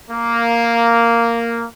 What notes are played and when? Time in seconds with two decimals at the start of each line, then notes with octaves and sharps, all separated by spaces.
0.11 A#3